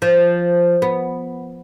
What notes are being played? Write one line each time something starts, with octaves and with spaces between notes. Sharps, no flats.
F3
B3